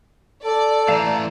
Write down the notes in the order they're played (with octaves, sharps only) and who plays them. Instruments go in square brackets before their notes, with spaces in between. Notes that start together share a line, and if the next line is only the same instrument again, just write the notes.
[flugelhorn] A4 [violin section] D5
[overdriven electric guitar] E3 A3 [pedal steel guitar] F5 A5 A#5